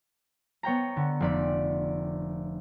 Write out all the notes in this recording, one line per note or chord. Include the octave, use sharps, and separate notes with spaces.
B3 C#5 G5 A#5
D3
F1 D5 B5